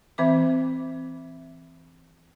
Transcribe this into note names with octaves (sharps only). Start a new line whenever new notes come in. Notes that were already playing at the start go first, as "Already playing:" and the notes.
E3 C4 E5 D6